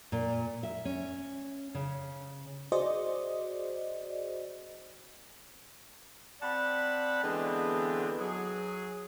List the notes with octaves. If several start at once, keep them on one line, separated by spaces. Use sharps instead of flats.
A#2
E5
C#4
C#3
F#4 G#4 C5 D5 D#5
C4 D5 F#5 A5 B5
D3 E3 G#3 B3 C4 D4
F#3 G#4